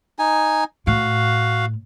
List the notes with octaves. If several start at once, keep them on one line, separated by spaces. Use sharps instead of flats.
D#4 G#5
A2 F#4 F5